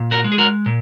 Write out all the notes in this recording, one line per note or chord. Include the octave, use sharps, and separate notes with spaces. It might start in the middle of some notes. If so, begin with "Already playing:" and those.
Already playing: A#2
F#4 A#4
G#3
G#4
F#4 A#4
A#2